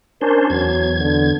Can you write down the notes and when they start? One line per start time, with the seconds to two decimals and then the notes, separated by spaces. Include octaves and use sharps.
0.21 C#4 D4 A#4 C5
0.50 E2 F#3 G#6
1.00 D3